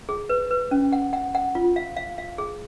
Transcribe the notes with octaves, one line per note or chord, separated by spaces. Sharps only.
G#4
B4
B4
C#4
F#5
F#5
F#5
F4
F5
F5
F5
G#4